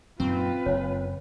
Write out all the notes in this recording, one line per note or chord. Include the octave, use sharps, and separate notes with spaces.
F#2 A#2 D#3 C4 F4 B4
F#1 C#5